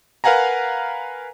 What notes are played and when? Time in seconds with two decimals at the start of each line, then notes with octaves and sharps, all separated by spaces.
0.24 A#4 B4 F5 F#5 G#5 A#5